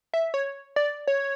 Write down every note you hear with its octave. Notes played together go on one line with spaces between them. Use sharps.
E5
C#5
D5
C#5